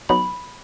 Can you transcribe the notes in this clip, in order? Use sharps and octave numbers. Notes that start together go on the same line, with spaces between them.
F#3 B3 D#4 B5